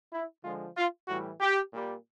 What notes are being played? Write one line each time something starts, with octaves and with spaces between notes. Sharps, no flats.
E4
D3 F3 G#3 F4
F4
A2 E3 G3 F#4
G4
A#2 G3